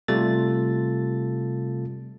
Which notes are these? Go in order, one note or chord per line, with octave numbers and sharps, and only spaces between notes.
C3 G3 A3 F4 A4 A6